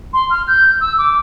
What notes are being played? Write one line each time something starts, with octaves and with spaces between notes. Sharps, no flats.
C6
F6
G6
E6
D6